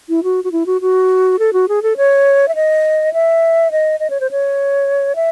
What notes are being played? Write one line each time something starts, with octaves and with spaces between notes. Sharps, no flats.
E4
F#4
F#4
E4
F#4
F#4
A4
F#4
G#4
A4
C#5
E5
D#5
E5
D#5
D#5
C#5
C5
C#5
E5